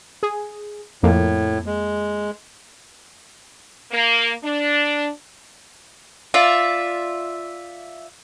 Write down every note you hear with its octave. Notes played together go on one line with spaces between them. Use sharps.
G#4
F2 A2 A#3
G#3
A#3
D4
F4 D5 E5